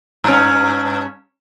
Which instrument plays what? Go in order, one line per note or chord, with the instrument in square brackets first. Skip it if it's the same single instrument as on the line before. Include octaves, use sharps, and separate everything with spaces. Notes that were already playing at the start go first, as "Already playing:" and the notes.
[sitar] G2 C#4